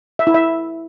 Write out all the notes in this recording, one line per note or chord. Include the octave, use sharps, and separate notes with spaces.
E5
E4
E5